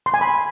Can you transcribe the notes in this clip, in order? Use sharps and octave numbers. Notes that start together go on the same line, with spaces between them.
C6
G#5
B5